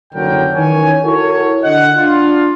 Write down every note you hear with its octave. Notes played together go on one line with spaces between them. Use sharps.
F#1 C2 D3 F#3 A#4 G5
D#3 E3 C#4 A#4 C#5 G#5
E4 F#4 A4 A#4 C#5
D3 D#5 F#5
D4 F4